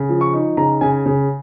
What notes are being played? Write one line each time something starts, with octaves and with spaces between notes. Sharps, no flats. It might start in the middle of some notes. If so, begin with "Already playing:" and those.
Already playing: C#3
F3
C#6
D#4
C#3 A#5
C#3 G#5
C#3